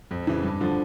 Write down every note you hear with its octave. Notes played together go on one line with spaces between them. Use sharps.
F2
C#3 E3
G2
D3 F3